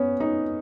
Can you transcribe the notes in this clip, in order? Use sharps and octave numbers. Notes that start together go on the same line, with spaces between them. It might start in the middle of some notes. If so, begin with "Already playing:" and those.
Already playing: B3 C#4
D#4